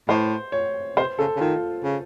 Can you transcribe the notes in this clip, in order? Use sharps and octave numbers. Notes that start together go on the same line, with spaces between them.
A2 C5
C#5
C3 C5
C#3 A4
C#3
D#3 F4
C#3